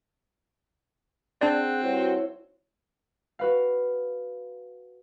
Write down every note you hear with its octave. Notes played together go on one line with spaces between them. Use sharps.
C4 D4 G#4 D5 F#5 F#6
G2 E4 F#4 C5 C#5
F#4 B4 F5